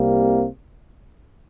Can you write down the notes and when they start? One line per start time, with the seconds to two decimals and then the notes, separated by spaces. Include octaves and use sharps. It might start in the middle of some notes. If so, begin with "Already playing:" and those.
Already playing: C2 C3 G3 A#3